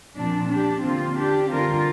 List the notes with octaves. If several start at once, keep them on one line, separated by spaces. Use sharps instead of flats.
A#2 F3 C4 D4
D4 G4
D3 A#3 C4 F4
D4 G4
D3 G3 C4 F4 A#4